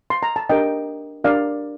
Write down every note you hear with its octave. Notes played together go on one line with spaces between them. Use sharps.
C6
A#5
A5
D4 G4 A#4 D#5 G5
D4 G4 A#4 D5 F5